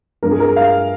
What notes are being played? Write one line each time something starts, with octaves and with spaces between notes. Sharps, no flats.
G2 F3 A#4
G#4
A#4
F5